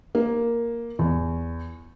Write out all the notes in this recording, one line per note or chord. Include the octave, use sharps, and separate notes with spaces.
A#3
E2